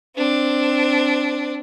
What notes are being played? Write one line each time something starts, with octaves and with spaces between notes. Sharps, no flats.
C4 D4